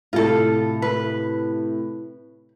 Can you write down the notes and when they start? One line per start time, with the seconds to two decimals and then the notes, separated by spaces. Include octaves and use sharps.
0.13 A2 C3 F4 A4
0.82 B4